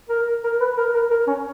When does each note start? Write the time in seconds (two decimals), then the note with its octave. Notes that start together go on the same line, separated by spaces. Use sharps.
0.09 A#4
0.44 A#4
0.60 B4
0.78 A#4
0.94 A#4
1.11 A#4
1.27 C#4